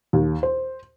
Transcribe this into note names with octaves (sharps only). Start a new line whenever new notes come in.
D#2
C5